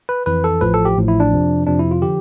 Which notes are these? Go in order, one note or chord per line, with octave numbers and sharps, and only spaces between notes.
B4
F2 E3 B4
A4
A1 A2 F3 B4
A4
G4
A1 A2 F3
E4
D4
F2 C3 F3
F2 C3 F3 D4
E4
F4
D3 F3 G4